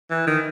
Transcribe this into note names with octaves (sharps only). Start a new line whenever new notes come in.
E3
D#3